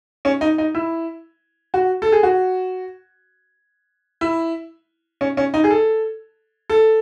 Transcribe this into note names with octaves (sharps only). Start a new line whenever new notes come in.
C#4
D#4
D#4
E4
F#4
A4
G#4
F#4
E4
C#4
C#4
D#4
G#4
A4
A4